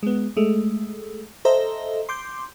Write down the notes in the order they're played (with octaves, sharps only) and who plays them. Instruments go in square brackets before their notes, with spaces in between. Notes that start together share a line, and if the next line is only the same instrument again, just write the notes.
[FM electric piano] G#3 B3
G#3 A3
A4 C5 D#5 E5 A#5
C6 D6 G6